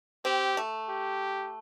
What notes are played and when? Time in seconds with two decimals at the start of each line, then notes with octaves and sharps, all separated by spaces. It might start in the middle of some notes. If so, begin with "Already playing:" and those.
0.25 C4 G4
0.57 A3
0.89 G4